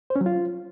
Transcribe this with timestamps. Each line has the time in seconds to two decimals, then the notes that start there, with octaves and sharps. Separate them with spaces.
0.10 C5
0.16 C#4
0.21 F#3
0.26 F4